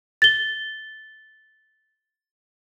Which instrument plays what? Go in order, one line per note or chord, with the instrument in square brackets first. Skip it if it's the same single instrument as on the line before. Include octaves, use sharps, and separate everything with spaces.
[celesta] A6 G7